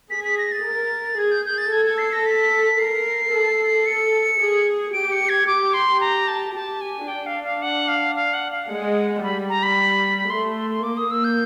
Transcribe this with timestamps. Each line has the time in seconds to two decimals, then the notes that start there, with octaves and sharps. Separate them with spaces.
0.10 G#4 B6
0.24 B6
0.38 A#6
0.52 A6
0.65 A#4
1.18 G#4 G#6
1.31 G6
1.46 G6
1.58 A6
1.72 A4 G#6
1.85 G#6
1.98 C7
2.13 A#6
2.26 B6
2.79 A#4 C7
3.33 A4
3.86 C#7
4.40 G#4
4.93 G4 D7
5.12 C#7
5.29 G#6
5.47 G4 D6
5.74 C6
6.00 A#5
6.28 A5
6.54 G4 A5
6.81 G#5
7.08 D4 G5
7.26 F5
7.44 F5
7.62 F#5
7.88 F5
8.16 F5
8.34 F#5
8.51 F5
8.69 G#3 F#5
9.23 G3 B5
9.49 A#5
9.63 B5
10.30 A3 C6
10.57 C6
10.71 C6
10.83 A#3 D6
10.97 D#6
11.11 E6
11.24 G6